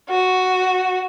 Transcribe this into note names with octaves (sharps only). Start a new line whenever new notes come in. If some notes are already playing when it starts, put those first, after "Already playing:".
F#4